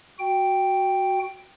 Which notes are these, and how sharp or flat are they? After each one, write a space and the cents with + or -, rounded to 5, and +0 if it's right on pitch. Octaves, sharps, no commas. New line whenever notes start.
F#4 +0 G5 +0